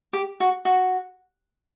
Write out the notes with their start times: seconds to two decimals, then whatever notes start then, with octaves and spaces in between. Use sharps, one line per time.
0.13 G4
0.40 F#4
0.65 F#4